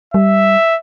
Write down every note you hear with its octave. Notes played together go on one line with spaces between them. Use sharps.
G3 E5